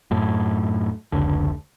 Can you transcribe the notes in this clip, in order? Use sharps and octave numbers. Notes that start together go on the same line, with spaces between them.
F#2 A2
F1 C#2 D3